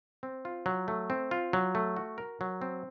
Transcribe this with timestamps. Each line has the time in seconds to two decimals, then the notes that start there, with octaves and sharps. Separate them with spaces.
0.23 C4
0.45 F4
0.66 F#3
0.88 A3
1.10 C4
1.31 F4
1.53 F#3
1.75 A3
1.96 F#4
2.18 A#4
2.41 F#3
2.62 C4